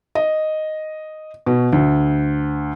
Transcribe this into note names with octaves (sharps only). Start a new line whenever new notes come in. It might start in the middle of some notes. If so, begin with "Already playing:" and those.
D#5
B2
D2